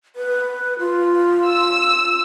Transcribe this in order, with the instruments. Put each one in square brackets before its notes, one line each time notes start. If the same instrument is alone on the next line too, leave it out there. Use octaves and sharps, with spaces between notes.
[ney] B4
F4
[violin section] E6